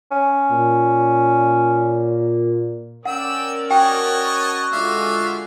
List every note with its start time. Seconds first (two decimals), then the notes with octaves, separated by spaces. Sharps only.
0.11 C#4
0.51 A#2
3.05 C#4 A#4 D5 F#5 G5 E6
3.71 F#4 C#5 D#5 G5 A5
4.73 D3 G#3 F4 D5 E5 F5